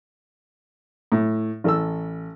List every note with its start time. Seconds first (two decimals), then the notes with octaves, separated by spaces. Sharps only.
1.12 A2
1.64 A1 A4 E6